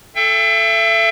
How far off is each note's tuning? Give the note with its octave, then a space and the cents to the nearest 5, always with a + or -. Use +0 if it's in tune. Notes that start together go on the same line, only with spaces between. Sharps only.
A4 +0 E5 +35 G5 +30